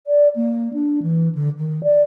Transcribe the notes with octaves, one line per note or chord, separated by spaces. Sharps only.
D5
A#3
D4
E3
D3
D#3
D5